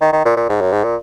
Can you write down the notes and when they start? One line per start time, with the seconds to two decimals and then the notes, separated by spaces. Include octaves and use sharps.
0.01 D#3
0.13 D#3
0.25 A#2
0.37 A#2
0.49 G#2
0.61 F#2
0.73 G#2
0.84 A#2